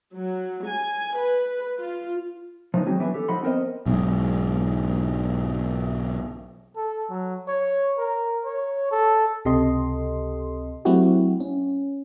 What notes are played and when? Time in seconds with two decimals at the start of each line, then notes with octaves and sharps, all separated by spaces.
0.14 F#3
0.66 G#5
1.16 B4
1.76 F4
2.74 F3 F#3 B3 C#4 D#4
2.86 F#3 G3 C4 F#4 G#4
3.00 E3 F#3 B3 D4 E4 B4
3.14 G4 A4
3.28 F3 D#4 D#5 F#5 B5 C6
3.43 B3 C4 A#4 C5 D#5
3.86 B1 G#2
6.76 A4
7.10 F#3
7.48 C#5
7.98 A#4
8.45 C#5
8.91 A4
9.45 C#2 C3 G4 A4 D#5 C6
10.85 F#3 A3 C4 E4 F#4 G4
11.40 C#4